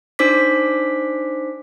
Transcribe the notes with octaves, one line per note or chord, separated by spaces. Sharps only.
D4 D#4 C5 D6 B6